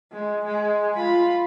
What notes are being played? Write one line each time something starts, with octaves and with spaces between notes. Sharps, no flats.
G#3
G#3
F4 B5